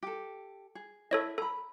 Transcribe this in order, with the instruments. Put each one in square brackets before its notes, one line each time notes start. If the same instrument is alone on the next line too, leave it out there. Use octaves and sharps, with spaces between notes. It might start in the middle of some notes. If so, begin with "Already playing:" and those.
[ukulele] G4 A4
G#4
[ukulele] E4 [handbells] A4 C#5 D#5
[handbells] A4 [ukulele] A#5 B5